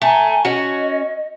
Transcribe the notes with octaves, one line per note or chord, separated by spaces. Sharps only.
A3 G5 G#5 A#5
C#4 F#4 D#5